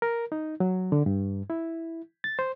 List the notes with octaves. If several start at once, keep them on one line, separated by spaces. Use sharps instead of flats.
A#4
D#4
F#3
D3
G2
E4
A6
C5